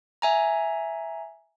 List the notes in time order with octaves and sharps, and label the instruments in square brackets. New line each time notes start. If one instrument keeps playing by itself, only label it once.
[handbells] E5 G#5 A#5